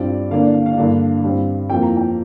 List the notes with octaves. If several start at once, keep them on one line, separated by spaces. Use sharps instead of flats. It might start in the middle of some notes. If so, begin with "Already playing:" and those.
Already playing: G2 G3 C4 F4 D5
D3 A#3 D4 F5
D5
F5
F5
G2 D3 A#3 D4
G2 G3 C4
F2 F3 A#3 G5
A#5
G5